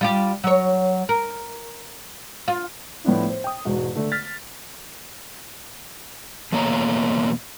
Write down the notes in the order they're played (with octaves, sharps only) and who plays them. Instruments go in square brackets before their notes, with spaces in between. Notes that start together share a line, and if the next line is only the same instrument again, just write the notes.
[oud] G3 F4 G4
F#3 C#5
A#4
F4
[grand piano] A2 F3 B3 D4 E4
C5
G5 D#6
E1 G#2 F#4
D3 A3
F6 A6 B6
[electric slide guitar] E2 B2 A3 A#3 C#5 A#5